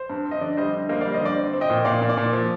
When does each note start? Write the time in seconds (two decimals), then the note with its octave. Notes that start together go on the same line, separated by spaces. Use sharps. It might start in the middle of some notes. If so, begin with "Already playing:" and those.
Already playing: C5
0.10 G2
0.25 C4
0.31 D#5
0.41 D3 D5
0.57 G3 C5 D#5
0.73 D3
0.89 A#3 C5 D#5
1.01 D5 F5
1.06 G3
1.13 C5 D#5
1.21 D3 D5
1.37 C4
1.53 C4
1.61 D#5 G5
1.70 A#2
1.85 A#2 D5 F5
2.01 A#2
2.09 D5
2.17 A#2
2.33 F3